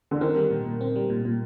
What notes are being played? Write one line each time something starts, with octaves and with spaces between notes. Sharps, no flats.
D3
D#3 C4
G3
A#2
A#2
C4
G3
A#2
A#2